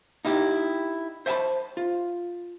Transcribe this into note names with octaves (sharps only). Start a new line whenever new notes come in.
D#4 E4 G4
C5 E5 G#5 A5 B5
F4